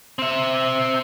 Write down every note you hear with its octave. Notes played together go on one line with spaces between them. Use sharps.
C4 E5